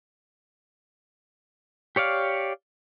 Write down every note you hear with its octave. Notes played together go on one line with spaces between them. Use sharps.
G4 C#5 D5 F5